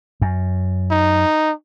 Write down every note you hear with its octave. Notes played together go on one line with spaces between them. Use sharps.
F#2
D#4